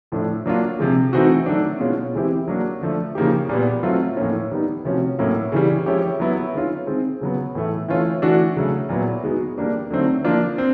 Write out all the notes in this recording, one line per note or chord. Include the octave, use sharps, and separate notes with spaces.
A2 F3 A3 D4
F#3 A#3 D4 F4
C3 F3 G#3
E3 A3 C4 D#4 F#4
D#3 F#3 A3 D4
B2 G#3 C#4 F4
E3 G#3 C4 E4 G4
F#3 A#3 D4 F#4
D3 F3 A3
C#3 F3 A#3 D#4 G4
A#2 G3 B3
F#3 A3 C4 F4
A2 F3 A#3 C#4
D#3 G3 B3 D#4
C3 F3 A3 C#4 F#4
A2 F#3 A#3 C#4 E4
C#3 E3 G3
F3 G#3 C#4 E4 G4
F#3 B3 E4
D#3 G#3 C#4 F4
D#3 G#3 C4
C#3 F#3 B3
A2 E3 A3
E3 A3 C#4 F4
E3 A3 D4 F#4
C#3 F#3 A3
A#2 F#3 B3 E4
D#3 G#3 B3 D#4 F#4
G3 A#3 D4 G4
D3 F#3 A3 C4 D#4
F3 A#3 D4 F4
C4